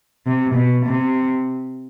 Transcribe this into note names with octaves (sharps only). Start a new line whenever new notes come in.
C3
B2
C3